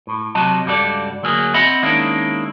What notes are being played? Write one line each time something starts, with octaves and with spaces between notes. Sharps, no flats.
A2
C3 F#3 F#4 D#5 A5
C#2 G2 G3 F#4 A4 D5
D2 F#3 A#3 F#4 G#4
C4 D#5 E5 F#5 B5
D#3 G#3 A#3 C#4 D4 E4